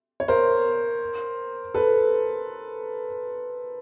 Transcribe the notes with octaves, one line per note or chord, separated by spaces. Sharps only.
C#5
A#4 C5
A4 B4